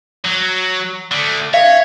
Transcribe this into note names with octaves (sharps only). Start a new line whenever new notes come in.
F#3
D3 A3
C#5 E5 F5